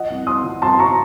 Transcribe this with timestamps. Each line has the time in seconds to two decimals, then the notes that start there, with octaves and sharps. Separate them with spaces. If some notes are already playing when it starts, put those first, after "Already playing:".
Already playing: F3 D#5 F#5
0.10 C2
0.27 C2 C6 D#6
0.44 F3
0.62 C2 A5 C6
0.79 A#5 C#6